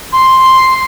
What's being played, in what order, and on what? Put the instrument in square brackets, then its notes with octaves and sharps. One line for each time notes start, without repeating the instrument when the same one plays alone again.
[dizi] C6